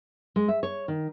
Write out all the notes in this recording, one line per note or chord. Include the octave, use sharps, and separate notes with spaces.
G#3
E5
C#5
D#3